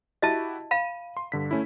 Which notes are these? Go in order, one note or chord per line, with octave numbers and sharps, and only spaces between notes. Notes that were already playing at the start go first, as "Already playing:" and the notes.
E4 F#4 G4 D#5 E5 A5
F5 B5 D#7
C6
G2 D3 B6
A3 C#4 E4